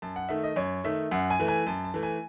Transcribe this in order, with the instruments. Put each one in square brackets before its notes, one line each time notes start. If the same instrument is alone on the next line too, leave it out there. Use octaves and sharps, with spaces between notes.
[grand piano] F#2 A5
F#5
D#3 A3 E5
D#5
F#2 C#5
D#3 A3 E5
F#2 F#5
G#5
E3 A3
G#5
F#2 A5
A5
E3 A3
G#5